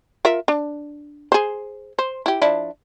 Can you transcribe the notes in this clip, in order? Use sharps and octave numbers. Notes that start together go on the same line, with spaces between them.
F4 A#4 E5
D4
G#4 C5
C5
E4 G4
F3 D4 E4